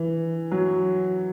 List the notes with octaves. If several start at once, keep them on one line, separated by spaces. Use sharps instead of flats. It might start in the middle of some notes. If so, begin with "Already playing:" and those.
Already playing: E3
F#3